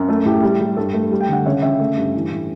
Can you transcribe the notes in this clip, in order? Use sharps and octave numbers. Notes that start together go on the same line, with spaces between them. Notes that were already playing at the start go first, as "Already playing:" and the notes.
Already playing: F#2
A3 A4
A2 G4
G3
G3
G2 A4
A3
G3
G5
D3 F#5
C#3 C#5 E5
C#3 E5 G5
A3
G2
E3
A2